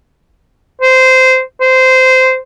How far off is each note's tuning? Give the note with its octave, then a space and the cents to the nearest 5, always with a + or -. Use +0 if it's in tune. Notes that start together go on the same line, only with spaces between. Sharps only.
C5 -15
C5 -15